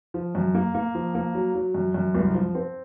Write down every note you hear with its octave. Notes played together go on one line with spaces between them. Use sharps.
F3
F#2
A#3
A#3
F3
A#3
F#3
F#3
F#2
F#2
C2
F3
C4